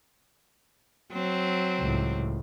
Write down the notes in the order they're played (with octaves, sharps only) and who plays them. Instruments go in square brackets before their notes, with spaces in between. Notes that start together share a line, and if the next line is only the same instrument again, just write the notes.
[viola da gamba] F#3 C4
[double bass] C#2 A2